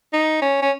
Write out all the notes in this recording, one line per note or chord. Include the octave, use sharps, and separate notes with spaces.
D#4
C#4
C#4